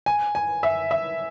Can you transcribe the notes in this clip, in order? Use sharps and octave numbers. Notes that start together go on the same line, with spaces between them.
G#5
G#5
E5
E5